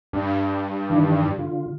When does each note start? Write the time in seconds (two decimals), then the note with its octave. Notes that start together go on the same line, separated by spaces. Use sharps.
0.13 G2
0.90 D#3 E3 D4
1.38 D3 F4